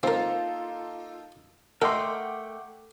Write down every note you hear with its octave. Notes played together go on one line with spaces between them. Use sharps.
A#3 C4 D#4 F4 A4 A#4
A3 A4 A#4 D#5 F#5 G5 C6 D6